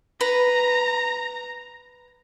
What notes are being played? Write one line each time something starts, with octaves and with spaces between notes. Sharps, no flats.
B4 A#5